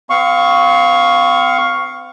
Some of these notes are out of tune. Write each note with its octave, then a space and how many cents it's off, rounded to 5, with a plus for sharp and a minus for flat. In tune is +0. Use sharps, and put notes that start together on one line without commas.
C4 -40 F5 +5 C#6 +0